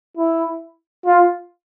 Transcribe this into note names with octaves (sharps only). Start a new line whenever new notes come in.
E4
F4